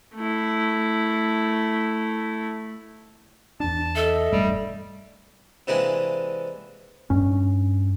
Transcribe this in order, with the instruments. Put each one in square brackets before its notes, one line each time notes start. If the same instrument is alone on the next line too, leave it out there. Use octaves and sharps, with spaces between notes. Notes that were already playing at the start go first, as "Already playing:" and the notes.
[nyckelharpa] A3 E4
[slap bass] E2 D4 [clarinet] A5
[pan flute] A4 [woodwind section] D#5 E5
[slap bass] E1 G2 A3 [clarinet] G3
[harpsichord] C3 E3 G#3 A#3 D4
[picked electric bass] G2 C#4